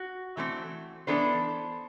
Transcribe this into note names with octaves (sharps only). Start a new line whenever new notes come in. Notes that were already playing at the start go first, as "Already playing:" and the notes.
Already playing: F#4
E3 A3 C4
E3 B3 D4 A4 C5